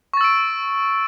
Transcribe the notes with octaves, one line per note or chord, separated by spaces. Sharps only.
C#6 E6 A6 D7